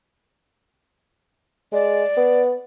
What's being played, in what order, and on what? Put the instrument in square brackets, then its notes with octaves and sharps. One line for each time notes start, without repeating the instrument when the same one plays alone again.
[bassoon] G#3 [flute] D5
[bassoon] B3